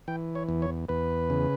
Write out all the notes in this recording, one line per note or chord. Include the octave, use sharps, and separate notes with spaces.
E3 G5
C#5
E2
C#5
E2 B4
C#3